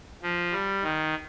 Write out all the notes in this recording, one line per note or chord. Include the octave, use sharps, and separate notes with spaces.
F3
G3
D#3